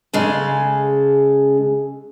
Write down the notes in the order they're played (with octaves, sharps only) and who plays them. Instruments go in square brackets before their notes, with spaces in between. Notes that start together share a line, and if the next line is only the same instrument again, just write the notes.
[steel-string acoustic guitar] C#3 G#3 A4